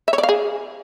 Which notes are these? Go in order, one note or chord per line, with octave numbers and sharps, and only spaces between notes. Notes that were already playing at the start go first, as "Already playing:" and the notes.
E5
C#5
D5
F5
G#4